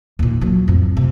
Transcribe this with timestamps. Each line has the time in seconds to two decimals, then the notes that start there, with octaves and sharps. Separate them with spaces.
0.19 D#2 A#2
0.41 F#3 A#3
0.68 F2 A2
0.97 C3